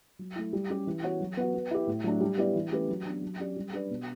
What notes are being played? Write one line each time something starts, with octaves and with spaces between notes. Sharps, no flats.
F#3
A3 E4
G3
C#4 G4
E3
B3 F#4 C#5
F#3
B3 F#4
B3
E4 G4
A2
F#3 A3 D4
G3
B3 E4 G4 D5
E3
A3 C#4 G4 B4
F#3
B3 D4
F#3
C#4 G4 D5
G3
D4 G4 B4 D5
B2